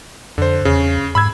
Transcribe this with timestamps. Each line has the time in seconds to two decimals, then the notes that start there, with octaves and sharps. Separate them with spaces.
0.38 F2 D3 C5
0.65 E2 C#3
1.15 G#2 B5 E6 G#6